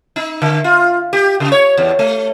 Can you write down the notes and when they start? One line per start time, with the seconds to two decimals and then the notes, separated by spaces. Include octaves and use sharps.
0.16 D#4
0.42 D3
0.64 F4
1.13 G4
1.40 C#3
1.52 C#5
1.77 E2
1.99 A3